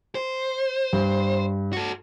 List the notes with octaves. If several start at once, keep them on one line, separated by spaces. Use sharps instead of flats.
C5
G2
F#4 A4